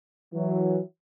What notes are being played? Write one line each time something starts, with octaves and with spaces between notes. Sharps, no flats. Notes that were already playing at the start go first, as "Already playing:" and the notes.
E3 F#3